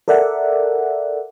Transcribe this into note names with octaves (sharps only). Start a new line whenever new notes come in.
A4 A#4 D5 E5 F#5